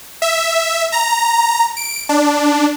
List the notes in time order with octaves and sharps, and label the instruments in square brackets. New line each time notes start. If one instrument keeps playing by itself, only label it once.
[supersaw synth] E5
A#5
D7
D4